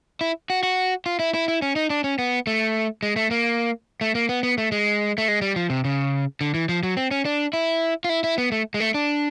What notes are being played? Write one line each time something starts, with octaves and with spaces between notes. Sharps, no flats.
E4
F#4
F#4
F4
E4
E4
E4
C#4
D#4
D4
C#4
B3
A3
G#3
A3
A#3
A3
A#3
B3
B3
A3
G#3
A3
G#3
G3
F3
C3
C#3
D3
E3
F3
F#3
C4
C#4
D4
E4
F4
E4
E4
B3
A3
G#3
A3
D4